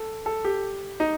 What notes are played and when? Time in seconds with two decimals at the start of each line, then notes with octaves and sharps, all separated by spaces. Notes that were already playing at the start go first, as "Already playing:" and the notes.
Already playing: A4
0.26 A4
0.45 G4
1.00 D#4